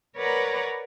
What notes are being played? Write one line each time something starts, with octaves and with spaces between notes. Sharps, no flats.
A#4 B4 C#5 D5 F#5 A#5